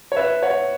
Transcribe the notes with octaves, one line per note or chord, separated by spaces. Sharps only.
C#5
B4 E5
C#5 F#5